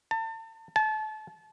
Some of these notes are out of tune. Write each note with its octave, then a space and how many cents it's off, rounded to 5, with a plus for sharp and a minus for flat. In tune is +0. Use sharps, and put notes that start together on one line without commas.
A5 +35
A5 -30